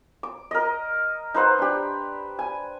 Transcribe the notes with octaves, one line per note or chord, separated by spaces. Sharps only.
D6
A#4 D#5
D#4 B4 C5 F#5
D4 G4
G#5